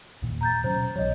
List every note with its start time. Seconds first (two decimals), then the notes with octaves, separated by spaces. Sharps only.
0.22 E1 D#2 A#2
0.41 A#5 G6 A6
0.64 B2 F#3 C#4 C5
0.96 B1 B2 F#3 C#5 D#5